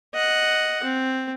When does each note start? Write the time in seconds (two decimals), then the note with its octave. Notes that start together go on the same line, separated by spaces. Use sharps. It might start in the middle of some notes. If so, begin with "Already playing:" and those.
0.15 D#5 F#5
0.84 C4